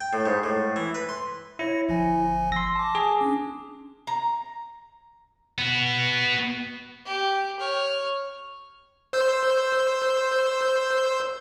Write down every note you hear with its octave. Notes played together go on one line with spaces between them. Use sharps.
G5
A2
G#2
A2
E3
B4
C6
E4 C#5 A#6 C#7
G1 F3 G#5
C6 E6 A#6
A5 D6
G#4
C#4 D4
A#5
B3 F#4
G4
C#5 F6
C5 E6 G6